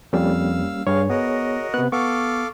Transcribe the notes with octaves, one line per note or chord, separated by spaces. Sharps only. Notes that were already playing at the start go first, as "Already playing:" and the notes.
F2 G3 A#3 C#4 F5 E6
G2 G#4 C#5 F5
B3 F#4 A#4 D#5
C3 B3 F#6
B3 A4 F5 C#6 D6